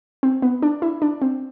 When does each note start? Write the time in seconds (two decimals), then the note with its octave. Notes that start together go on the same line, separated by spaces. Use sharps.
0.23 C4
0.42 B3
0.62 D4
0.82 E4
1.02 D4
1.22 C4